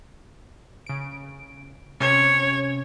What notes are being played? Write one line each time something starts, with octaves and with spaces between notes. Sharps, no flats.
C#3 D7
C3 C#4 C#5